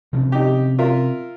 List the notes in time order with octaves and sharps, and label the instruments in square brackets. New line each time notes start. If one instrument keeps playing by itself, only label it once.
[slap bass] C3 F3 C#4
[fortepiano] D#4 G4
F4 A#4 E5